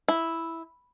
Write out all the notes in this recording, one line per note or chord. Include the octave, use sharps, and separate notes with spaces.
E4